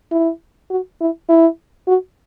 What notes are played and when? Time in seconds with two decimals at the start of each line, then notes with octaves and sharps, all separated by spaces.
0.12 E4
0.70 F#4
1.01 E4
1.29 E4
1.87 F#4